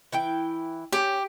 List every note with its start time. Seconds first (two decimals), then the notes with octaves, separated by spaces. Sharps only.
0.12 E3 E4 G5
0.92 C#4 G4